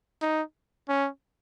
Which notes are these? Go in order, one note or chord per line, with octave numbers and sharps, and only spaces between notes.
D#4
C#4